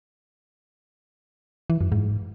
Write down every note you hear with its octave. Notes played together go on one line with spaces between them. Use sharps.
E3
F#2
G#2